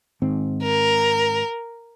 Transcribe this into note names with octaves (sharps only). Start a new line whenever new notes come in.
G#2 D#3 C4
A#4